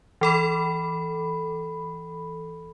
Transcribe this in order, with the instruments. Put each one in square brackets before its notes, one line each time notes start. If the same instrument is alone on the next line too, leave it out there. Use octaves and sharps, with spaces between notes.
[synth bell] E3 A4 B5